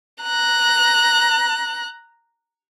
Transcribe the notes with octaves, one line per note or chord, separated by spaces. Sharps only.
A#5 F#6